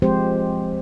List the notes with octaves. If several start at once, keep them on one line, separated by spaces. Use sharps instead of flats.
F3 G#3 C4 G4 C5